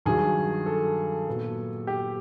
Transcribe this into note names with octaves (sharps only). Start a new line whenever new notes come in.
G2 D#3 F#3 G#4
A4
A#2 F#3 B3
G4